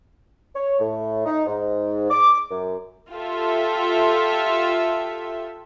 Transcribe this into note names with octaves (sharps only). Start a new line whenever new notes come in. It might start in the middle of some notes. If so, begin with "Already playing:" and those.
C#5
A2
D#4
G#2
D6
F#2
F4 G4 A4 E5